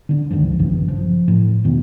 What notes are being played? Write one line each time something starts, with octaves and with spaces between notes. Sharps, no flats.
D3 D4
C#2 G2 D#3 F3
A#1 G2 C#3 E3
F3
A2
E2 B2 D#3 E3